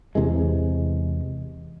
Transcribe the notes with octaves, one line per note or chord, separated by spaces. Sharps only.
E2 C3 E3 G#3